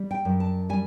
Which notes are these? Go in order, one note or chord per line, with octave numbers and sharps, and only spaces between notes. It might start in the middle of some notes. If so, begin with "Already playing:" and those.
Already playing: G3
G5
F#2
A5
G3 G#5